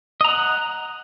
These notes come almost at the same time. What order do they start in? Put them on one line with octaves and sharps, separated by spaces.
D#5 A#5 F#5